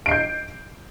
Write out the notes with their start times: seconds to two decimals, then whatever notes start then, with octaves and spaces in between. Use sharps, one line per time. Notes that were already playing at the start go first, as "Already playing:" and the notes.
0.06 D7
0.09 C7
0.11 G6